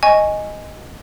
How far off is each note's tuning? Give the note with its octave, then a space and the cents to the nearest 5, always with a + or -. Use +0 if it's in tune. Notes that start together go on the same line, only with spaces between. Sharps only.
D#5 +0 G#5 +0 C#6 +0